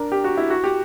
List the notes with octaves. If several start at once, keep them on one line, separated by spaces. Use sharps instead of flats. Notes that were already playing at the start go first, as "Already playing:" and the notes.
Already playing: D4 A#4
G4
F#4
E4
F#4
G4